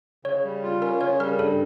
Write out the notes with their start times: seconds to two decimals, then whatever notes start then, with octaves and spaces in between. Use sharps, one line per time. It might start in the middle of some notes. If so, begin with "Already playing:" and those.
0.25 C#3 C#5
0.44 G3
0.63 F4
0.82 C#4 A#4
1.01 C#3 C#5
1.20 G3 A#4
1.39 G2 A4